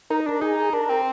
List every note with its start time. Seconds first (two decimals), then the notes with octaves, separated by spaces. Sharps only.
0.10 D#4 A#4
0.26 D4 A#4
0.41 D#4 G#4
0.73 D4 A#4
0.89 C4